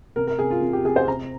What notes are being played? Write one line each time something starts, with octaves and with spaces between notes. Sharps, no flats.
C3 A#4
A#4
C3 G#4
F4
C3
G4
C3 G#4
C5
C3 A#5